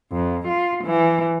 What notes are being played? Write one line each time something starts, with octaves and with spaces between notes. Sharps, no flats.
F2
F4
E3